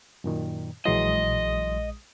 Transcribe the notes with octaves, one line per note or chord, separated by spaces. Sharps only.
F#2 A#2 D#3
A#1 E3 F#3 G#3 D#5 C6 D#6